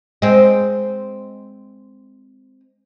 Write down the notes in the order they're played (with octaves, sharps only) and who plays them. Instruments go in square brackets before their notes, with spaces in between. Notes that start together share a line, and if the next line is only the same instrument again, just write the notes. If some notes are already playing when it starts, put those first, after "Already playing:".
[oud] G#3 C4